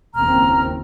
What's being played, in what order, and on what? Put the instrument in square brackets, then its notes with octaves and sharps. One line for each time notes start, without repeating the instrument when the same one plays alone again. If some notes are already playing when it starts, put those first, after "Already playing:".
[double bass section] F#1 D#2 C4 [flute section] A#5 F6